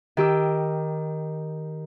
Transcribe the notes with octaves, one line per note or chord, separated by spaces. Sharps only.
D#3 G4 E6